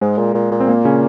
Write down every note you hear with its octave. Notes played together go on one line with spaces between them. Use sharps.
G#2 G#3
A#2
A#2
A#2
C4
A#3
C#3 C#4